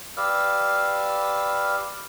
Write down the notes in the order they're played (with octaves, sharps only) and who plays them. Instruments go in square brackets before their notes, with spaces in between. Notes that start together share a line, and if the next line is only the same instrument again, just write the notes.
[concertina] G4 B4 D5 F5 E6 F6